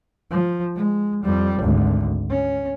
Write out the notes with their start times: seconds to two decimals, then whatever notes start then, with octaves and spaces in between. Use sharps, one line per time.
0.31 F3
0.76 G#3
1.23 F2 G3
1.60 G#1 D2
2.30 C#4